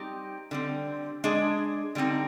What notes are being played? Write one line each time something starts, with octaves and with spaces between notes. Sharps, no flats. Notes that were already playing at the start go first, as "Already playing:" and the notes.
Already playing: G3 C4 D#4 G4
D3 G3 C4
G#3 D4 G#4
D3 G3 C4 D#4